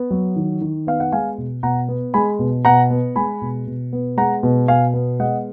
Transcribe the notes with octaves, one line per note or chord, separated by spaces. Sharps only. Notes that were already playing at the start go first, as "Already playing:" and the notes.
Already playing: B3
F#3
D#3
D#3
B3 F5
F#5
G#3 F5 G#5
B2
B2 F#5 A#5
B3
G#3 G#5 B5
B2
B2 F#5 A#5
B3
G#3 G#5 B5
B2
B2
B3
G#3 F#5 A#5
B2
B2 F5 G#5
B3
G#3 D#5 F#5